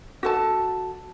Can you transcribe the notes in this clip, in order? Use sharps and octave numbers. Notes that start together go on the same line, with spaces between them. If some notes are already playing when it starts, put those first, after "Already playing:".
F#4 A4 A5